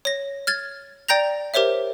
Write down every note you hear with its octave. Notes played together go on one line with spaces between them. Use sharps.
C#5 A#6
F6 G#6 A6
D5 G5 A#5 G6 A#6 F7
G4 A#4 C5 C#5 E5